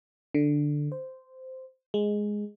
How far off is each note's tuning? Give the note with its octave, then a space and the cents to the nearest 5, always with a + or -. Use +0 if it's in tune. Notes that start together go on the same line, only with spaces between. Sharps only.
D3 +5
C5 -10
G#3 +0